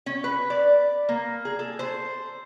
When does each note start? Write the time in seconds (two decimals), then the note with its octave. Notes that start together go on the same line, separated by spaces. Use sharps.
0.06 C#4
0.24 B4
0.50 D5
1.09 A#3
1.45 G#4
1.59 A4
1.79 C5